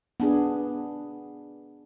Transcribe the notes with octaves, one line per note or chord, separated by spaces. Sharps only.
B3 D4 G#4